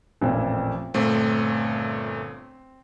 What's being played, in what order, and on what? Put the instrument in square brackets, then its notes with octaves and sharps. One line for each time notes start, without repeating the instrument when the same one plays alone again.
[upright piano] A1 F2 A#2
[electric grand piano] G1 A#2 A3 [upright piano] C4